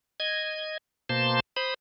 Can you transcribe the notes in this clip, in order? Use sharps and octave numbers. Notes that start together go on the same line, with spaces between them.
D#5 G#6
B2 A#3 C5 A5 C6
C5 B5 D#6